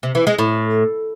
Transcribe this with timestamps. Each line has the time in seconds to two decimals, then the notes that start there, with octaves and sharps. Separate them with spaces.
0.03 C3
0.15 E3
0.27 G#3
0.39 A2